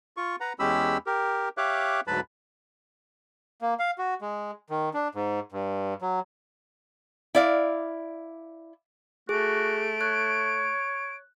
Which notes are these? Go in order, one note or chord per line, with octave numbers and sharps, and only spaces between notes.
F4 C#6
B4 F#5 A#5
E2 G#3 C#4 G4 B5 E6
G4 A#4
G4 C#5 E5 F5 D6 F#6
D2 G#2 F#3 B4 A5 B5
A#3
F5
F#4
G#3
D#3
D4
G#2
G2
F#3
E4 D5 F5
A3 F#4 G#4 D7
C#5 F#6